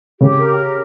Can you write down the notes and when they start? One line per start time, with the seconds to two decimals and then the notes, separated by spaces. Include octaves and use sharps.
0.20 C#3 G4
0.38 A#4
0.57 G4